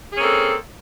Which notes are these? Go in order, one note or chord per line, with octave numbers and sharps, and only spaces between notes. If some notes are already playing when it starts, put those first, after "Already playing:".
A#3 C4 C#4 G#4 A4